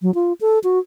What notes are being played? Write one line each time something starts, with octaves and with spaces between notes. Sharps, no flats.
F#3
F4
A4
F#4